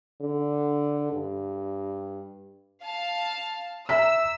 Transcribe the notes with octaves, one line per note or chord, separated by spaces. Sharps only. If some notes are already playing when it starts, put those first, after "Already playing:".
D3
G2
F5 A5
E5 A#5 E6 B6